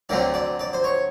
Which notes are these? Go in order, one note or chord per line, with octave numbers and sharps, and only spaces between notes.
D2 D3 F#3 A3 C4 D5
D5
D5
C5
C#5